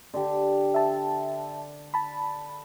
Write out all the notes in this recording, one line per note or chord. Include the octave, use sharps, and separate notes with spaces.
D3 G4
E5 A5
A5 B5